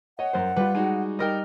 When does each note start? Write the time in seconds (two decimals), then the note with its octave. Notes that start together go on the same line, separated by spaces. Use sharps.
0.19 C#5 D#5 F#5
0.33 F#2 A#4 C5
0.56 G3 F4 B4
0.75 G#3 D#4 F#4 D#7
1.19 G3 D#4 A#4 D#5 G5